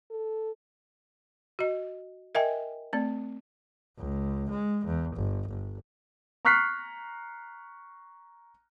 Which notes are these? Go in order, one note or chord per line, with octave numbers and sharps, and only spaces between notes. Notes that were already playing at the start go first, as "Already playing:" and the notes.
A4
F#4 D#5
A#4 D#5 E5 G5 G#5
A3 C4 D5
C#2
G#3
E2
G1
G1
A#5 C#6 F6 F#6 B6 C7